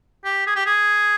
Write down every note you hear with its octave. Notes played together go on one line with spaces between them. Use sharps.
G4
G#4
G4
G#4